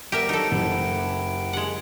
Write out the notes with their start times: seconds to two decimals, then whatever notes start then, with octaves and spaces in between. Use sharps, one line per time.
0.12 G3 B3 G4 A#4 E5 D7
0.29 F#3 D#4 F#4 A4
0.51 F#1 E4 G4 F#5
1.53 G#3 F#5